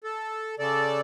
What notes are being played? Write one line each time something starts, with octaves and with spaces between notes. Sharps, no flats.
A4
C#3 A4 D5